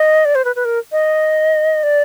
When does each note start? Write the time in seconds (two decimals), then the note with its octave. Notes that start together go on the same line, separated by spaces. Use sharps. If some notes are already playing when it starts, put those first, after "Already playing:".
Already playing: D#5
0.25 D5
0.35 C5
0.45 B4
0.56 B4
0.65 A#4
0.92 D#5
1.83 D5